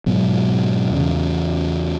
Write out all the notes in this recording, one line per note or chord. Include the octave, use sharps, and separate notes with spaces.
G#2 B2 F#3
E2 C#3